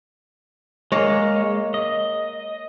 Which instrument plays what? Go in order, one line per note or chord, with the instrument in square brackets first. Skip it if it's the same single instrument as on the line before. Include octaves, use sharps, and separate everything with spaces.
[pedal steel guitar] G#3 [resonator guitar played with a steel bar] A#3 C#5
[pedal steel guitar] D#5